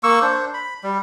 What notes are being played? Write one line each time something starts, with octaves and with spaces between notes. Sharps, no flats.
A#3 C#6 E6
D4 C5
B5
G3